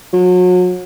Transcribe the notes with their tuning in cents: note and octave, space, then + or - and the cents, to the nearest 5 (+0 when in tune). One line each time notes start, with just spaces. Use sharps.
F#3 -35